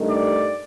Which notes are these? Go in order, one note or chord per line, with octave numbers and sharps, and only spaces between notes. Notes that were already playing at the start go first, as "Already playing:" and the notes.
Already playing: G2 D#3 A3
D5